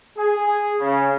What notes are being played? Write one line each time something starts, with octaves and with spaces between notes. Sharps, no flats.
G#4
C#3